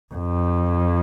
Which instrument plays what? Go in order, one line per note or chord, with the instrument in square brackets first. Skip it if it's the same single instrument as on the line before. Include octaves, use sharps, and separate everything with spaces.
[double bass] F2